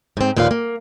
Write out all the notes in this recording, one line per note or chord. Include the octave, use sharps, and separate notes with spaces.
G#2 C4
D#2 A#2 F3 B4 F5
A#3